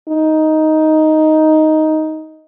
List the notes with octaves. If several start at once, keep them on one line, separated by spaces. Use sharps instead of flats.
D#4